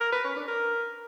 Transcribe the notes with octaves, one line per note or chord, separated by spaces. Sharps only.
A#4
B4
C#4
D4
A#4